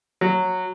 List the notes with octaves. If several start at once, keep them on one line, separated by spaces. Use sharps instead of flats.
F#3